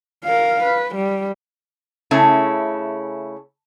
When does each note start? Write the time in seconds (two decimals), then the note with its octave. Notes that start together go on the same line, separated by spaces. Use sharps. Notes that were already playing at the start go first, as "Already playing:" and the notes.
0.25 A#4 F5
0.63 B4
0.95 G3
2.11 C#3 A3 C#4 E4